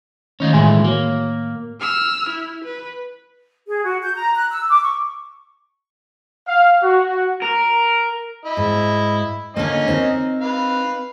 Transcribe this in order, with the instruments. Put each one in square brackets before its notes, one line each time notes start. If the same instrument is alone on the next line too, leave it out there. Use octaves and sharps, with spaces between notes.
[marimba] D#3 A3 [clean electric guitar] C#4 D#4 F4
[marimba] A2 G#5 C6 [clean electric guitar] E3 G#3 A3
[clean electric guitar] A#3 [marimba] F#4 C#5
[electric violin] E6 F6
E4
B4
[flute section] G#4
F#4
G6
A#5
F#6
E6
D6
C#6
[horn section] F5
F#4
[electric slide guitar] A#4
[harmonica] E4 D#5
[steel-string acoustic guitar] G#2
[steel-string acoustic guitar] D3 A#3 [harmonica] C#4 D#5
[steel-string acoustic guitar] C4 D#4 A#4
[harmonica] B4 F5